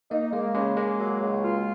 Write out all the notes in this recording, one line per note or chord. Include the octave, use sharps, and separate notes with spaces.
A#3 D#4
G#3 A#3
C#3 G#3
G#3 A#3
F#3
C#2
F4